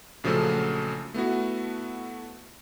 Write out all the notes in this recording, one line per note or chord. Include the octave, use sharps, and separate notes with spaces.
A#1 C#3 F3 F#3 A3 A4
A3 B3 E4 F#4